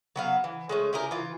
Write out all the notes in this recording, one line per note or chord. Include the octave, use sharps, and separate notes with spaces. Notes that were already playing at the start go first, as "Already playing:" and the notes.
F#3 B3 F5
E3
G#3 A3 C#4
E4 G4 G#4 A#4
E3 F4